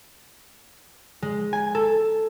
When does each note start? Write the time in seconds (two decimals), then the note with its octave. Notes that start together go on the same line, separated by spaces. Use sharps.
1.22 G#3
1.53 G#5
1.75 A4